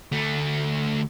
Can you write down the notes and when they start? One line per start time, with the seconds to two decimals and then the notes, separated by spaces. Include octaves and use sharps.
0.12 D2 A3